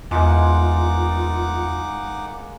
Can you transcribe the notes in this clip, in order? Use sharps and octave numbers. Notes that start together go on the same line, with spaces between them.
E2 G#3 A#3 D#4 F4 F#5 D6